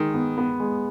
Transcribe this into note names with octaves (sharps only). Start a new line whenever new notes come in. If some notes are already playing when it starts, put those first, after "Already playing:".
Already playing: D#3 G#3
B3
B3
G#3